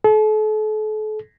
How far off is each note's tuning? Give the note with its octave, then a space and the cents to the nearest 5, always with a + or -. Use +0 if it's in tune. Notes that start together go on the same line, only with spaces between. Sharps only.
A4 -40